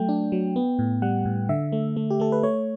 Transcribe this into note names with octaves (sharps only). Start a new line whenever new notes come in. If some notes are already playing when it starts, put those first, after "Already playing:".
Already playing: F#3 A3 G5
D4
F#3
B3
A2
G3 F#5
A2
D3 E5
A3
A3
G4
A3 A4
B4
A3 C#5